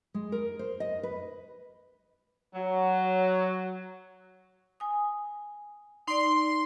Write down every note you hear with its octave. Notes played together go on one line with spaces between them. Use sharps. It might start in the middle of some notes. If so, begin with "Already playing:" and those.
G#3
A#4
C5
D#5
B4
F#3
G#5 D#6
D#4 D5 C6